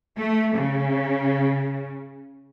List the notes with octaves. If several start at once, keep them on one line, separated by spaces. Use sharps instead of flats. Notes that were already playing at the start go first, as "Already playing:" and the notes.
A3
C#3